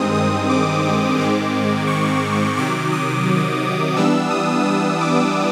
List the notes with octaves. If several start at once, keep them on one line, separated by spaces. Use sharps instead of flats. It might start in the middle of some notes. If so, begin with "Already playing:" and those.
Already playing: G2 D#3 G#3 C4 D#6
D#6
D6
G#2 D#3 G#3 C4
C#6
C3 D#3 F#3 D6
D#6
E3 G3 B3 D4 E6
D#6
D#6
D6